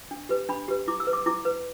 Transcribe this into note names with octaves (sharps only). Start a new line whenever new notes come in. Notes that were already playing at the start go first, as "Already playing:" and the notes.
D4
G4 B4
D4 B5
G4 B4
E4 D6
E6
B4
D6
E4 D6
B4